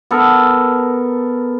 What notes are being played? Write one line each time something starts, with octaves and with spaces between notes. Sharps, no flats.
B3 A4 A#4